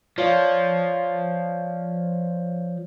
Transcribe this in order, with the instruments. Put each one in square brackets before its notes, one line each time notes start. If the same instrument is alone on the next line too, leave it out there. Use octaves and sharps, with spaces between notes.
[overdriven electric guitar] F3 [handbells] C#5 D5 F5